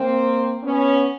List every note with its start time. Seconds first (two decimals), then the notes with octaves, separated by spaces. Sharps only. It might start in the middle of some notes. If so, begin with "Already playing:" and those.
Already playing: A#3 C4
0.63 B3 C#4